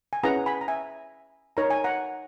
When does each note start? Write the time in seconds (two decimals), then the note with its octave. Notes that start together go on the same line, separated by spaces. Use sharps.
0.13 G#5
0.23 C#4 E4 G#4 B4 F#5 A#5
0.46 G#5 B5
0.61 A#5
0.68 E5 G#5
1.57 D#4 A#4 C#5 A#5
1.70 G#5
1.84 F#5 A#5